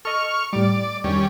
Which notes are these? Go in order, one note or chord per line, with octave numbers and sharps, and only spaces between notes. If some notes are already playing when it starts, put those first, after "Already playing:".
A4 D#5 C#6 F6
A2 G3 D5
E2 G2 D#3 G3 C#4